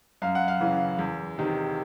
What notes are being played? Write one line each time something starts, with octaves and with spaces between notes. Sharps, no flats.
F#2 F5
F#5
F5
C#3 E3
E2
C3 D#3